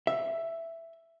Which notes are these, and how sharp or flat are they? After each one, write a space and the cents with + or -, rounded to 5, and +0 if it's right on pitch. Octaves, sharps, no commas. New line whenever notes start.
E5 +5